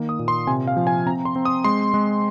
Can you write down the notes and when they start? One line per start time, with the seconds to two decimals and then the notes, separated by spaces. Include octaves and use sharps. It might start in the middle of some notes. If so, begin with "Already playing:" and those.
Already playing: D#3 A#3
0.09 D#6
0.19 A#2
0.28 C6
0.47 C3 G#5
0.67 F5
0.77 F3
0.87 G#5
1.06 C4 A#5
1.25 C6
1.35 C4
1.45 D#6
1.64 G#3 C6
1.94 G#3